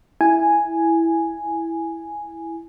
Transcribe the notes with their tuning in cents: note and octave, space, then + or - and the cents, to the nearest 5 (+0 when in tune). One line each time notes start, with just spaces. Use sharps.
E4 +0 G#5 +0